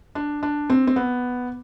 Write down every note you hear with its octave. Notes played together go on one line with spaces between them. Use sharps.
D4
D4
C4
C4
B3